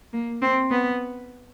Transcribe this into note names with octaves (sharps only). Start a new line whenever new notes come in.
A#3
C4
B3